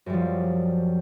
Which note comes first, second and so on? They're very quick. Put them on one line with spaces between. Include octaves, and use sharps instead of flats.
F#2 G3 F3